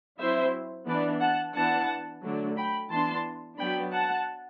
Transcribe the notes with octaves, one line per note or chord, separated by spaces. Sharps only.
F#3 C4 E4 C5 E5
E3 B3 D4 B4 D5
F#5 A5
E3 B3 D4 F#5 A5
D3 F#3 A3 D4
G5 B5
E3 B3 D4 A5 C6
F#3 B3 D4 G5 B5
F#5 A5